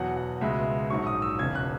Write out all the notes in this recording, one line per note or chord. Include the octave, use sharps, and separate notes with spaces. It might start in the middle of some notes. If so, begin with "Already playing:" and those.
Already playing: E2 B2 F#3 F#5
F#5
C#2 B2 G#3 E5
A#1 G#2 F#3 C#6
D#6
E6
E1 E2 C#3 G#6
F#6